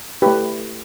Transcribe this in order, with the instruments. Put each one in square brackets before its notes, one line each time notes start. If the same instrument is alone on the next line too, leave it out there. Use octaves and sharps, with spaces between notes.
[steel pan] A3 E4 G4 B4